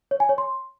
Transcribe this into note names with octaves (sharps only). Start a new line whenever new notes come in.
C#5
G#5
C#5
C6